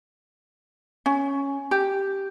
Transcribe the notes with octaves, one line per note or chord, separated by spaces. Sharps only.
C#4
G4